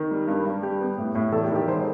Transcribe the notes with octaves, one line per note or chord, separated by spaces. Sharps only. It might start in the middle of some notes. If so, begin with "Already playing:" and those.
Already playing: D#3
G3
G2
G2
G3 G4
B3
A2
A2
E2 A4
G4
D#3
G4
E1 C5